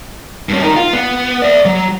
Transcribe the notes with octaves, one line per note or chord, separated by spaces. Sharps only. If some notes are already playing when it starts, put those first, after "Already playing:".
G2 C#4
D#4 A#4
F4
B3
D5 E5
F#3